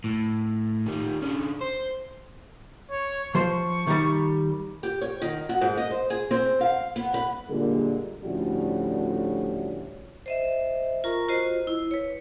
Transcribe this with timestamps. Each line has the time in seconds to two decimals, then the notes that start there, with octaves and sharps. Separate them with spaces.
0.04 A2
0.86 D#3 G3
1.22 D3 C#4
1.61 C5
2.91 C#5
3.35 F3 C5 C#6
3.87 D#3 G3
4.83 G4
5.01 C#5
5.22 D#3
5.49 F#4
5.61 G#2
5.77 D#5
5.91 C5
6.10 G#4
6.31 C4
6.61 F5
6.96 B3
7.14 B4
7.50 A#2 D3 G3 G#3 A#3 A#4
8.23 D2 A2 F3 G3 C#4 F#4
10.26 C5 D#5 E5
11.04 F4 A#4 A#5 C#6
11.28 F4 F#4 C5 D#5
11.67 E4
11.91 B4 C#5